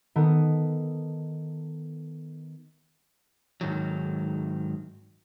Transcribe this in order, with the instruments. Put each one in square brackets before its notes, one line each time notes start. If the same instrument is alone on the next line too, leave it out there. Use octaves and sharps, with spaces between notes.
[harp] D#3 B3 A4
[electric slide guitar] G#2 D#3 F#3